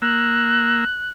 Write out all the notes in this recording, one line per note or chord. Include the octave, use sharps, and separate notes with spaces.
A#3 E6 F#6